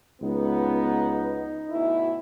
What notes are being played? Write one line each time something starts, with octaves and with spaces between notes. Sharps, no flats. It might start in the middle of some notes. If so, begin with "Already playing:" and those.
C#2 B3 D#4
D2 B2 E4